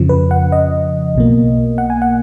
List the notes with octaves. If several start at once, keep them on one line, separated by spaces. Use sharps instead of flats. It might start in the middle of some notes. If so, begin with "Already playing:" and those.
Already playing: F2 C#3 F3
B4
F#5
D#5
B1 B2 A#3
F#5
G#5
F#5